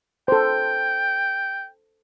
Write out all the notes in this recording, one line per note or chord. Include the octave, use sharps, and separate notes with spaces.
A4 C5 G5